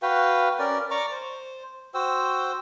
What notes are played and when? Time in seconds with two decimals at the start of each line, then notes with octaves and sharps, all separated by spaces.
0.02 F#4 B4 F5 G5
0.59 C#4 A#4 D5
0.91 D5 A#5 C#6 D6
1.12 C5
1.94 F#4 C5 G5 E6